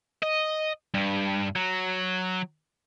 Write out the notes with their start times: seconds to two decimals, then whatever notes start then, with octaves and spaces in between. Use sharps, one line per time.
0.23 D#5
0.94 G2
1.56 F#3